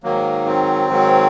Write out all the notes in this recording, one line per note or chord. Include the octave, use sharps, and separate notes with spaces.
G#2 D#3 F#3 A#3
C4
G#2 D#3 F#3